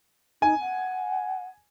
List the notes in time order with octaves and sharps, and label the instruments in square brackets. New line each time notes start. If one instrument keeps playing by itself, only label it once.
[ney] D#4 [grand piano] G#5
[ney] F#5